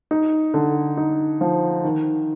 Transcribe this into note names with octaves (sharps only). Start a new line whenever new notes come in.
D#4
D3
D#4
F3
D#3